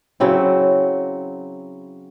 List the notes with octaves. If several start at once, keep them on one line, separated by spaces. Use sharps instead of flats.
C#3 F#3 C4 E4